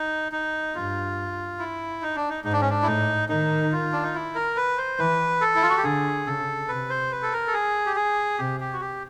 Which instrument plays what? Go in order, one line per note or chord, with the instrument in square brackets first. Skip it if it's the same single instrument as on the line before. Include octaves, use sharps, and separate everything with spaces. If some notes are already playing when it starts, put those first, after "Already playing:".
Already playing: [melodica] D#4
D#4
[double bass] G2 [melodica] F4
[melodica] E4
D#4
D4
D#4
[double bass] G#2 [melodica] D#4
[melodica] D4
C#4
D4
E4
[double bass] A2 [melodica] D#4
[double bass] D#3 [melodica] D#4
[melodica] F4
D4
D#4
E4
A#4
B4
C5
[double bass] E3 [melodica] B4
[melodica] A4
E4
F4
F#4
G4
[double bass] D3 [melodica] G#4
[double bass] C#3 [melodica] A4
[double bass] C3 [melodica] B4
[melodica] C5
B4
A4
A#4
A4
G#4
G4
G#4
[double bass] C3 [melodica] G4
[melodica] G4
F#4
G4